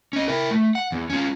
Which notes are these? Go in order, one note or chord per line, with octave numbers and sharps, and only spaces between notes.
C#4 D#5
E4 A#4
A3
F#5
E2
C#4 F4